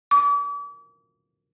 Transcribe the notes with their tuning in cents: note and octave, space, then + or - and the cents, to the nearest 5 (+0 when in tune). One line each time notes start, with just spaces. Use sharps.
D6 -40